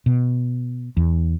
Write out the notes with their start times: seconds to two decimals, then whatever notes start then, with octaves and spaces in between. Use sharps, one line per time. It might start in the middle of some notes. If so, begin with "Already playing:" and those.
0.06 B2
0.97 E2